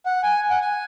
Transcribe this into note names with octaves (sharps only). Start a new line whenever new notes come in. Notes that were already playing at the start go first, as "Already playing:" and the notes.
F#5
G#5
F#5
G#5